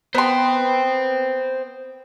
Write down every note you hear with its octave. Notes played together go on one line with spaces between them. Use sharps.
B3 C5 G5 C6